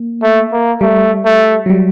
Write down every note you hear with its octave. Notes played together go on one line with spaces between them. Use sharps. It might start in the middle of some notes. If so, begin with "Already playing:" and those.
Already playing: A#3
A3
A#3
G3 A3
A3
F#3
G3